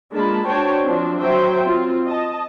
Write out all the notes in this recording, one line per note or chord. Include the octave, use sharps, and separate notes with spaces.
G#3 A#3 D4 F4 A5 B5
D4 F#4 C5 C#5 G5 A5
F3 C4 D4
F#3 C5 E5 G5
C4 F4
D#5 A5